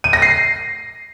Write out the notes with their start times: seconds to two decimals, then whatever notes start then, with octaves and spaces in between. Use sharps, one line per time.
0.04 D#7
0.13 A#6
0.22 C7